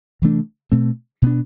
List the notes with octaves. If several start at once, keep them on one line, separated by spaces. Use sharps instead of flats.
C3 E3 A3 D4
B2 A3 C4
B2 B3 D4